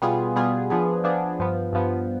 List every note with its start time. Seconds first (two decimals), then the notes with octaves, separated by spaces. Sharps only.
0.02 B2 G3 B3 F4 G#4
0.36 B2 G3 B3 F4 G#4
0.70 F3 B3 D4 G#4
1.04 F3 B3 D4 G#4
1.39 G2 F3 B3
1.72 G2 F3 B3